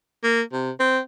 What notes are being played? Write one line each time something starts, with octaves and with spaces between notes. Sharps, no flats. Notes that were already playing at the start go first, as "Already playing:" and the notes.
A#3
C3
C4